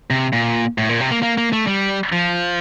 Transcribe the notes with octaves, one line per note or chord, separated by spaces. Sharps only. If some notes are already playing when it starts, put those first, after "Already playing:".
C3
A#2
A2
A#2
C3
A#3
A#3
A#3
A3
G3
F3